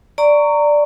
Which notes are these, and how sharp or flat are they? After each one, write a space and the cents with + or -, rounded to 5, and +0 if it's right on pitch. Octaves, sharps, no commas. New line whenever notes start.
D5 +0 A#5 -20 C#6 +10